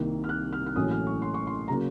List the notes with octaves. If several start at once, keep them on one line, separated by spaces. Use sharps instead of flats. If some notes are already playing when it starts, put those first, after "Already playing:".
Already playing: C2 C3 D#3 A#3
F6
F#6
F6
F6
A1 A2 F#3 A#3 C#4 D#6
F6
C#6
C6
C#6
C6
C#3 F#3 A#3 A#5